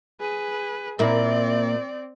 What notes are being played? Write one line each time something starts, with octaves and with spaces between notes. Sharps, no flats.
G#4 B4
A#2 A#3 C4 E4 D5